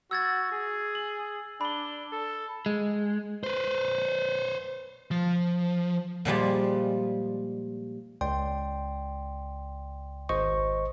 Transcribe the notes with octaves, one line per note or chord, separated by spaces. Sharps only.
F#4 E6 G#6 A6
G#4
F#7
D4 B5 G7
A4
G#3
B4 C5
F3
A#2 F3 G3 G#3
C#2 D5 G5 C6
G#1 C5 D#5 C#6